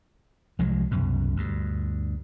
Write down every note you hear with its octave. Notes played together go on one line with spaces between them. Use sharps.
C2 F3 F#3 G#3
C2 F#2 B2
D2 G2